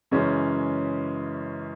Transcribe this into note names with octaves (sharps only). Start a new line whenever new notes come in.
F#2 C#3 E3 G#3 C#4